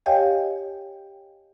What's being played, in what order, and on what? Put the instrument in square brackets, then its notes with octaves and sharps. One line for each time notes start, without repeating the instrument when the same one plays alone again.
[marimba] G4 C#5 D#5 F5 G5 G#5